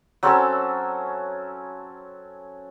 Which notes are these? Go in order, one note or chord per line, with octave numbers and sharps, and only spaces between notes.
F#3 C4 C#4 A4